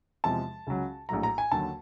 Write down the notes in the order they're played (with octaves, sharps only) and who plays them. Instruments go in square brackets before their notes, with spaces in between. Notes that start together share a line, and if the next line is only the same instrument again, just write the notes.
[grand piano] E2 C3 F3 G#3 A5
C#2 C#3 F#3
A#1 A2 F#3 A#5
A#5
G#5
D#2 D3 F#3 A5